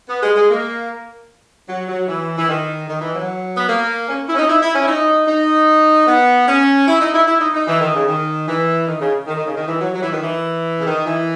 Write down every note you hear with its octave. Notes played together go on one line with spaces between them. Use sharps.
B3
G#3
G#3
A#3
F#3
F#3
E3
E3
D#3
D#3
E3
F#3
B3
A#3
C#4
E4
C#4
D#4
E4
E4
C#4
E4
D#4
D#4
B3
C#4
E4
D#4
E4
E4
D#4
D#4
E3
D#3
C#3
D#3
E3
D#3
C#3
D#3
D#3
C#3
D#3
E3
F#3
F#3
E3
D#3
E3
C#3
D#3
E3